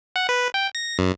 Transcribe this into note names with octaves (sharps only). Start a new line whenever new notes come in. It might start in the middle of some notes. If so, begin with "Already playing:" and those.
F#5
B4
G5
A#6
F#2